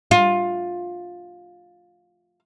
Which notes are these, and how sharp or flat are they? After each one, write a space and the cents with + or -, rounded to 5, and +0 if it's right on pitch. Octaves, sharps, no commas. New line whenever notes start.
F4 +15